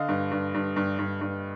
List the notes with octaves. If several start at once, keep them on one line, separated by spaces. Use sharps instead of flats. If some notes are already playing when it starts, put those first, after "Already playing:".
Already playing: D3 D#5 F5
G2
G2
G2
G2
G2
G2